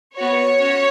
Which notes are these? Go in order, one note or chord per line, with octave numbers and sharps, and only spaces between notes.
B3 F#4 C#5
C#4 F#4